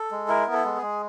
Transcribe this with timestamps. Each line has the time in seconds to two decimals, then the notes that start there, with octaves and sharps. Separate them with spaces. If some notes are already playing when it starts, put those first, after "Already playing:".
Already playing: A4
0.11 G#3
0.28 E4 A#4
0.47 B3
0.53 A4
0.65 G#3
0.77 G#4
0.82 G#3